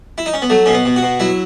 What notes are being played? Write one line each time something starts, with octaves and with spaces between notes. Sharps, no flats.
E4
D#4
C#4
B3
F#3 A3
B2 C#4
B3
B2
F#4
B2
F#3 E4